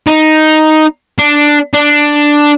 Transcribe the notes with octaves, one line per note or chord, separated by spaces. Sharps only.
D#4
D4
D4